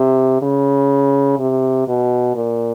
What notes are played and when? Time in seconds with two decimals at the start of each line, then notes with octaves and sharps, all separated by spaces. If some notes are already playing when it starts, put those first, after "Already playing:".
Already playing: C3
0.42 C#3
1.39 C3
1.88 B2
2.36 A#2